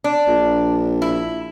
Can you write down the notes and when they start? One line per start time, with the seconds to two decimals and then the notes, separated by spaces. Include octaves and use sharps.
0.04 D4
0.27 A#1
1.02 E4